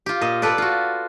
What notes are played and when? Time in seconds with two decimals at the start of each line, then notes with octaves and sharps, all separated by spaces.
0.06 F4 G4
0.21 A#2 D#5
0.42 A4 B4 D5
0.58 F4 F#4